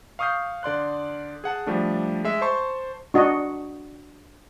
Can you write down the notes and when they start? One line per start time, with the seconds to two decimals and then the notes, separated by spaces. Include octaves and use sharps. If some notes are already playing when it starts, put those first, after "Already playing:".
0.19 F5 C#6 D#6 F6 G6 C7
0.63 D3 D5 C6 F#6
1.44 G#4 F#5 A5
1.67 F3 G3 A3 D4
2.24 G#3 E5
2.41 C5 A5 C6 C#6
3.14 D4 F#4 D#5